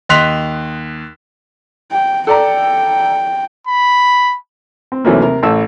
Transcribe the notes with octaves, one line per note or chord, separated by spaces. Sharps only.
D#2 D#5 C6 F#6 B6 F7
G5
A4 D5 G5 A#5
B5
C4
D#2 C3 E3 F#3 A3 A#3
C3 A#4
A1 A3 E6